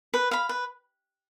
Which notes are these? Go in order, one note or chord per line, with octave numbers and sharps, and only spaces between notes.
B4
F5 B5
B4